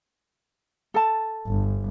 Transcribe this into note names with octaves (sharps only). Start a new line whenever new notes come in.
A4 A5
G1